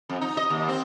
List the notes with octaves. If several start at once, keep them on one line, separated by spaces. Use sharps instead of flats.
F2
D#4
D#5
D#2
C4